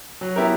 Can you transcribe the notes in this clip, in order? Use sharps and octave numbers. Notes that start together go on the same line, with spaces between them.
F#3
B3 E4 G4 A#4